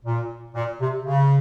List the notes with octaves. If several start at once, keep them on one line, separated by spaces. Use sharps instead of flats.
A#2
A#2
C3
C#3